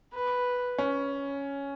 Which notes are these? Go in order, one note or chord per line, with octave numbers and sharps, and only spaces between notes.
B4
C#4